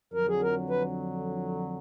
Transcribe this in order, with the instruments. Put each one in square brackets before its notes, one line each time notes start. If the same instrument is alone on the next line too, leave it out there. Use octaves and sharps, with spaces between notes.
[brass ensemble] F2 D3 F#3 [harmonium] A#4
[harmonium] G#4
A#4
B4